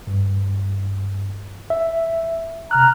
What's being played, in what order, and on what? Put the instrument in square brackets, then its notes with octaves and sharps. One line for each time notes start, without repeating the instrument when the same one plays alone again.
[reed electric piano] G2
E5
[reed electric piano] C3 F6 F#6 [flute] A#5